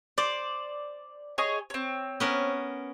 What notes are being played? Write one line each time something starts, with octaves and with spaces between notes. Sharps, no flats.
C5 D5
G#4 C#5 D#5
C4 C#5
B3 C#4 A#4